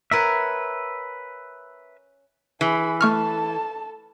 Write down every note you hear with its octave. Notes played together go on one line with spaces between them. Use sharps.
C#4 A#4 B4 E5 F#5
E3 G#4 B5
A3 A4 A5 C#6 F6